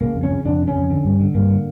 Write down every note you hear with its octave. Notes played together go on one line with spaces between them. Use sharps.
C#3 A#3
F2
C#4
C#3
F2 D4
C#3
C#4
F2
D3
G2
D3
G2 A#3
D3